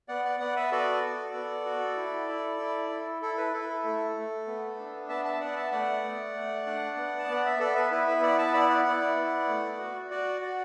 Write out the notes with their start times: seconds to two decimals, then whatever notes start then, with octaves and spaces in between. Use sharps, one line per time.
0.08 B3 D5 F#5
0.25 D5 F#5
0.40 B3 D5 F#5
0.56 B4 E5
0.71 F#4 A4 D5
1.03 F#4
1.33 B3
1.65 F#4
1.97 E4
2.28 E4
2.59 E4
2.90 E4
3.22 E4 A4
3.38 B4
3.53 E4 A4
3.69 A4
3.84 A3
4.16 A3
4.47 B3
4.79 D4
5.09 B3 E5 A5
5.25 E5 A5
5.41 B3 D5 F#5
5.56 E5 A5
5.72 A3 D5 F#5
6.04 A3
6.35 A3
6.66 D4
6.97 B3
7.19 A5
7.28 B3 F#5
7.45 E5
7.59 B3 A4 D5
7.75 B4 E5
7.91 E4 B4
8.07 B4 E5
8.22 B3 D5 F#5
8.38 E5 A5
8.53 E4 D5 F#5
8.69 D5 F#5
8.85 E4 D5 F#5
9.16 B3
9.48 A3
9.79 F#4
10.10 F#4 D5 F#5
10.41 F#4 D5 F#5